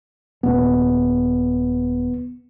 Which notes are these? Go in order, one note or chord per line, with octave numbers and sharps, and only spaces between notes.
D#1 B3